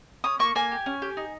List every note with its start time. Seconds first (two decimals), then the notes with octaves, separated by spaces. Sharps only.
0.24 C#4 D#6
0.39 A#3 C#6
0.55 A#3 G#5
0.71 G4
0.86 C#4
1.02 G4
1.17 D#4